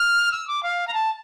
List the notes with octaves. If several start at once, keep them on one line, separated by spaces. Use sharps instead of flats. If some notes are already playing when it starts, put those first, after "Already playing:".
Already playing: F6
E6
D6
F5
A#5
A5